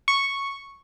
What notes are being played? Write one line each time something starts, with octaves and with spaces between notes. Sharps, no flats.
C#6